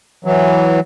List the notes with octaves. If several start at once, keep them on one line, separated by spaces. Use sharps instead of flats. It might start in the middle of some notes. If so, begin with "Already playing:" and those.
E3 F#3